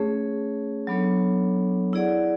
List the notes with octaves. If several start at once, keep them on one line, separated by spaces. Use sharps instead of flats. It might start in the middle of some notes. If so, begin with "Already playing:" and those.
Already playing: A3 C#4 G#4 C#5
F#3 B3 D4 A4 C#5
E4 G#4 D5 F#5